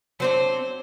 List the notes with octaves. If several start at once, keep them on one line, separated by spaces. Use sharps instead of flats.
F#3 C4 D4 C5